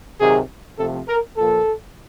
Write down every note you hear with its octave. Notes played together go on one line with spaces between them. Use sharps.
C3 D#3 F#3 G#4
C3 F3 A3 C4 A4
A#4
A#2 F3 A#3 A4